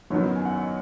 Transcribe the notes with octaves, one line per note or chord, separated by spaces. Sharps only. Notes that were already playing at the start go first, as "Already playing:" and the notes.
F#2 D#3 F#3 B3 C#5
G#5
F#5
D#5